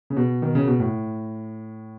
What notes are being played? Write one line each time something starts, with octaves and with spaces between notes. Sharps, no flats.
C#3
B2
D#3
C#3
B2
A2